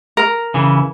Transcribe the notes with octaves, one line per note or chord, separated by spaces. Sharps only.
A#4
C#3 E3